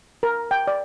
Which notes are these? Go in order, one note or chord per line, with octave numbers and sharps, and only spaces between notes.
A#4
G5
D5